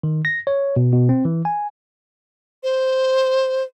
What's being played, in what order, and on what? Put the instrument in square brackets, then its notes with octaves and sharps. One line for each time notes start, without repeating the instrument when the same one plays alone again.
[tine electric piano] D#3
A#6
C#5
B2
B2
C4
E3
G#5
[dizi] C5